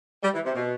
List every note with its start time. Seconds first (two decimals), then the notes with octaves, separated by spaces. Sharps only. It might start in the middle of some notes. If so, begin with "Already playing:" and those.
0.23 G3
0.34 E3
0.45 C3
0.55 B2